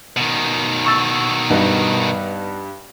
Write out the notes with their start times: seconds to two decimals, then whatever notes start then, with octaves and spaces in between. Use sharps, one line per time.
0.17 B2 D#3
0.85 C#6 E6 A6
1.50 G2 B3 D#4 F#4